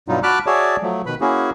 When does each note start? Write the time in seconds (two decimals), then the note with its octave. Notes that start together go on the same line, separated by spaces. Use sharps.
0.08 G2 B2 F#3 G3 D#4 F4
0.23 F#4 A5 B5 D6 F6 F#6
0.46 F#4 G#4 C#5 D5 E5 A5
0.82 F3 F#3 A3
1.06 B2 D#3 B4 B5
1.21 A#3 C#4 E4 F#4 G#4